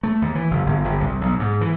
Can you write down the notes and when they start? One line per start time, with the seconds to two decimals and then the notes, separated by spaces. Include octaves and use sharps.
0.03 A3
0.22 D#2
0.35 E3
0.51 F#1
0.66 G1
0.84 G1
1.01 C2
1.21 B1
1.39 G#2
1.61 E3